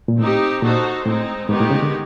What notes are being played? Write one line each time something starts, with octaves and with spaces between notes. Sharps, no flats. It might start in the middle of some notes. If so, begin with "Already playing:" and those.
A#2
A2 C4 D#4 G4
A#2 D#4 F#4 A4 C5
A2 G#3 C4 D#4
G#2 D#3 G#3 B3 D#4 G4
A2
C#3
D3